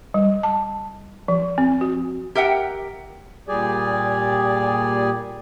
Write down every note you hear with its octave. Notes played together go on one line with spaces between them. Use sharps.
G3
A5
F3
C4
F#4
G4 A#4 E5 F#5 G5
A#2 G3 G4 G#4 D5 G#5